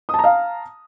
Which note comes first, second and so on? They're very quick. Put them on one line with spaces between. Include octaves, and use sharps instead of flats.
D#6 A5 A#5 F5